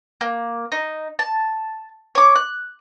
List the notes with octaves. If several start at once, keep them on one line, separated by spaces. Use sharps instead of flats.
A#3
D#4
A5
C#5 D6
F#6